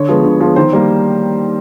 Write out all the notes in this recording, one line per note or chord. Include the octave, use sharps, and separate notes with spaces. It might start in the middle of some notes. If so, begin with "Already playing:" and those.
Already playing: D3 C#5
F3 G#3 B3
D3
F3 G#3 B3
D#3 C5
G3 A#3